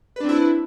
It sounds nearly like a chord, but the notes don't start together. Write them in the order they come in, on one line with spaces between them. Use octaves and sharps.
B4 D4 C4 E4